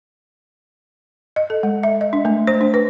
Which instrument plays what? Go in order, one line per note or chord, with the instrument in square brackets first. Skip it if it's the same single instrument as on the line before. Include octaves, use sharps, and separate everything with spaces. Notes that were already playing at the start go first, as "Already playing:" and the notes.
[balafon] D#5
A4
G#3
E5
D#5
D4
A3
C5
D4
B4